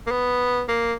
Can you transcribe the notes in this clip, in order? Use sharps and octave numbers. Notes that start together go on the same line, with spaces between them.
A#3
B3
A#3